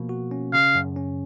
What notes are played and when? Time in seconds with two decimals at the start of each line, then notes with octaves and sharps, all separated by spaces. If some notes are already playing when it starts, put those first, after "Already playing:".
Already playing: B2 F3 A#3
0.09 F#4
0.31 C#4
0.53 C#3 F5
0.75 F#2
0.96 C#4